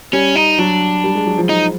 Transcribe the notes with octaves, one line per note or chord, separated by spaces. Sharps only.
G3 C#4
D#4
F#3 D4
G3
G#3
F#3
F3
F3 D#4